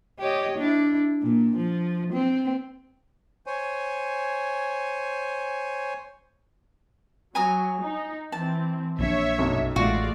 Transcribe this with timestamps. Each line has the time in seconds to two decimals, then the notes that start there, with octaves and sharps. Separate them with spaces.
0.20 G4 C#5 D#5
0.58 D4 E4
1.23 A#2
1.56 F3
2.13 C4
3.46 C5 C#5 G#5
7.35 F#3 G#5 A#5 D#6
7.82 D#4
8.32 E3 C4 A5
8.99 A#1 C4 D4 C#5 E5
9.38 B1 F#2
9.76 A1 G#3 A3 F4 F#4 D5 F5